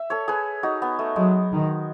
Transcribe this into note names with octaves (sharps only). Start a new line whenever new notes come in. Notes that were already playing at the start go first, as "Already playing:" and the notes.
Already playing: E5
A4 C#5
G#4 B4
D#4 F#4
B3
A3
F#3 G#3
D#3